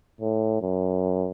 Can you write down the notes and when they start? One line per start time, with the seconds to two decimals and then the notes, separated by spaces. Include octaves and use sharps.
0.21 A2
0.62 F#2